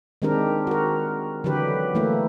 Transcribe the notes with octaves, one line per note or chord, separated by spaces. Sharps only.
D#3 G#3 C4 D4 G4 A#4
F#4 A#4
D3 E3 F#3 G4 B4
E3 A3 A#3 E4